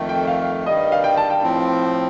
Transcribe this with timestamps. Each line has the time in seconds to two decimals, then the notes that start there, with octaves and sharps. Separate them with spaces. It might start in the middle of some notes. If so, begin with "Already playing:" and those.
Already playing: F2 D#3 A3
0.09 G5
0.27 F5
0.66 G2 D#3 G3 D#5
0.92 F5
1.04 G5
1.17 A5
1.30 G5
1.42 A2 F3 C4